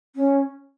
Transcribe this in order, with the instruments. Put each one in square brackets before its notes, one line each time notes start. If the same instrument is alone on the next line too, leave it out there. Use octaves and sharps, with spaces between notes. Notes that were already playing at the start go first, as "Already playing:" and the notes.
[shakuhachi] C#4